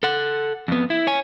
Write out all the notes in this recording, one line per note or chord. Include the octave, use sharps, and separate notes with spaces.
A4 F#5
F2 B3
E4
C#5 G#5